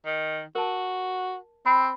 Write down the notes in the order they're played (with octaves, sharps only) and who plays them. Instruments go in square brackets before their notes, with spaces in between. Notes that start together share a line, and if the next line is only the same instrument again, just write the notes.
[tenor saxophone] D#3
[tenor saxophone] F#4 [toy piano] A#4 A5
[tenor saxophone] C4 [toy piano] B5